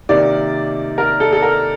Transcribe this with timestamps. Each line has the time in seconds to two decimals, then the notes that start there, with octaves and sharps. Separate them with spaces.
0.09 C3 D#3 A#3 D5
0.98 A#4
1.20 A4
1.33 A4
1.42 A#4